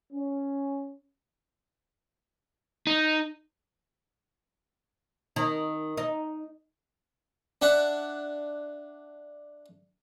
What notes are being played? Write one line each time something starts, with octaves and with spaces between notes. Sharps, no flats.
C#4
D#4
D#3
D#4
D4 E5 F#5